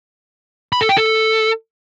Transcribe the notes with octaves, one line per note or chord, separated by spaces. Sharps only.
B5
A4
G5
A4